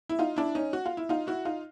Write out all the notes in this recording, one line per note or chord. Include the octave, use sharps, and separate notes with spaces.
E4
D#4 F4
D4 E4
C#4 D#4
F#4
F4
E4
D#4 F4
E4 F#4
D#4 F4